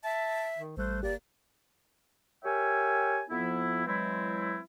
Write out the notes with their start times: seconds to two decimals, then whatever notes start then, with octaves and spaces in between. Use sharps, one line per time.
0.04 E5 A5
0.58 D#3
0.77 A1 G3 A3 C5 F#6
1.03 G1 A#3 G4 D5
2.44 G4 A#4 C#5 E5 G5 G#5
3.29 F2 F3 B3 E4
3.86 E3 F#3 G#3 C4 E4